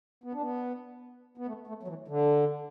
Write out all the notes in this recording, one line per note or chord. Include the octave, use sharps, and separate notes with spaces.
B3
D4
B3
B3
A3
A3
F#3
E3
D3